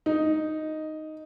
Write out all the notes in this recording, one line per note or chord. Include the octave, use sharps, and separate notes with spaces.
D#4